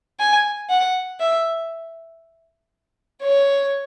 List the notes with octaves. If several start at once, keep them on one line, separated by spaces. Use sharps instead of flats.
G#5
F#5
E5
C#5